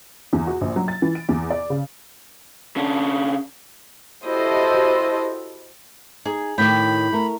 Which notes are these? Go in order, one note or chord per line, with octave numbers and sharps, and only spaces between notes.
E2
F#4
A#1
F#3
A6
E3
D7
E2
D5
C#3
C#3 D4
E4 F#4 G4 A4 C5 D#5
D#4 G#4
A2 D#3 G4 B4 G5 B5
A3 A#4